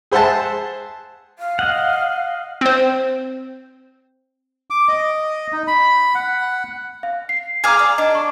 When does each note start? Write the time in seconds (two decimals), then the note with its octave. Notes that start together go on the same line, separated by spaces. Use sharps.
0.12 G#4 C5 E5 F#5 A5
1.39 F5
1.59 D#5 F#5
2.61 C4 C5
4.70 D6
4.88 D#5
5.52 D#4
5.67 B5
6.15 F#5
7.03 F5
7.29 C7
7.64 G#4 F5 A#5 D6 F6 G#6
7.79 D5
7.98 D4 D#5
8.15 C#6